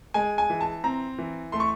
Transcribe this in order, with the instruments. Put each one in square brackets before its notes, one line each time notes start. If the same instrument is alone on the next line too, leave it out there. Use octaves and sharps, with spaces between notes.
[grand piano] G#3 G#5
G#5
E3
A5
C4 A#5
E3
A3 C6
C#6